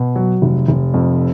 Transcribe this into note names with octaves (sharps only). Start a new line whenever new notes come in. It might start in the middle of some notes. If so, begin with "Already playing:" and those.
Already playing: B2
F#3
F1
F1
F2